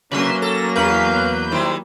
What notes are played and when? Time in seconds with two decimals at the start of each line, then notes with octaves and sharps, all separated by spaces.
0.12 C3 F#3 A#3 C#4 B4 E5 C6
0.42 A4 A#6
0.76 E2 C#4 A#4 B4 F5 G6
1.51 D#3 G3 E4 C5